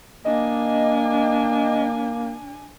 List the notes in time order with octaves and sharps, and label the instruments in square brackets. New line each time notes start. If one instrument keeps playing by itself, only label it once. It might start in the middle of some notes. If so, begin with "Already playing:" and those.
[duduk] A#3 [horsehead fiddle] D4 G#5 [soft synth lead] D#5